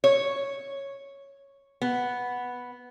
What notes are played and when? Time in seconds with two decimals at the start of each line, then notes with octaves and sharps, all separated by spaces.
0.04 C#5
1.82 B3